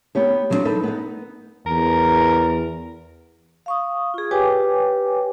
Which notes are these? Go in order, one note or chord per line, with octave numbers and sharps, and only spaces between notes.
B3 D#4 G4 C#5
F3 F#3 B3 C4 D4 F4
D#4 A4 B4
B3 D#4
E2 A#4
F5 C#6 D#6
F4 G#4
G4 B4 C#5 G5 G#5 D6